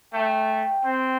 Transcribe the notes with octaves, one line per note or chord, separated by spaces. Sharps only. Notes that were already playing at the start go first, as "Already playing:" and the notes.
A3 G5
C4